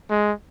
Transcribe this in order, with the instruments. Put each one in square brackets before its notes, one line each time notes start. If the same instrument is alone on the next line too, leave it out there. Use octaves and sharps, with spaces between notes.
[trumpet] G#3